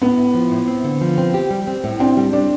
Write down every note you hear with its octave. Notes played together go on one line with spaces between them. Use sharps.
A2 B3
A2
F3
A2
C4
D3
F3
C4
G4
G3
C4
A2
C4 D4
G3
G3 D4